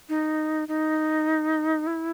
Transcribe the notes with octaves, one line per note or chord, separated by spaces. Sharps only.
D#4
D#4
E4